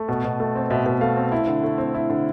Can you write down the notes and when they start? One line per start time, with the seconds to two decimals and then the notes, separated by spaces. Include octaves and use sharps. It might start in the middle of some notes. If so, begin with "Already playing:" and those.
Already playing: A3
0.08 B2
0.24 B2
0.40 A3
0.55 C4
0.71 B2 E5
0.86 B2
1.01 A3 F5
1.17 C4
1.32 E4
1.47 D3
1.63 A3
1.78 C4
1.94 E4
2.10 D3